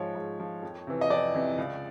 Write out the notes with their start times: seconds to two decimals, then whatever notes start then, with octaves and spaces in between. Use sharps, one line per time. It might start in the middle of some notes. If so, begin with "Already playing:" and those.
Already playing: G#2 F3 C#5
0.15 G#2
0.40 F3
0.63 F2
0.87 C3 E3
1.01 D#5
1.10 F2 D5
1.35 C3 E3
1.58 C#2